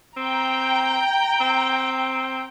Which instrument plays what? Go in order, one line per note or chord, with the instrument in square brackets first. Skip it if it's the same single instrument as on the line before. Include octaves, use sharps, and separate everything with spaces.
[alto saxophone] C4 [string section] G5 A#5
[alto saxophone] C4